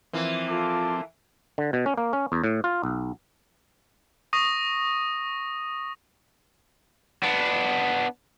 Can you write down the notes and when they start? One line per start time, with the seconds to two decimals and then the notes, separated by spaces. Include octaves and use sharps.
0.14 E3 F3 A#3 C4
0.48 F4 A4 A5 D6
1.58 D3
1.73 B2
1.86 C#4
1.98 A#3
2.13 C#4
2.32 E2
2.44 A2
2.64 F4
2.83 B1
4.33 C#6 D#6 A#6
7.23 B3 D4